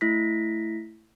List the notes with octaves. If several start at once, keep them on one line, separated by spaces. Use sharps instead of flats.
A3 E4 A#6 B6